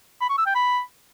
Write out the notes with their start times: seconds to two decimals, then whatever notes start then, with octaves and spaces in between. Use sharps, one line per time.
0.21 B5
0.29 C#6
0.38 E6
0.46 G5
0.55 B5